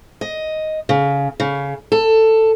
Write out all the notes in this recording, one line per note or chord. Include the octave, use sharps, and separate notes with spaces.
D#5
C#3
C#3
A4